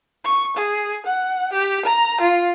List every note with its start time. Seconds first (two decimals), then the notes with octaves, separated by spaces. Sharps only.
0.25 C#6
0.56 G#4
1.06 F#5
1.53 G4
1.85 A#5
2.21 F4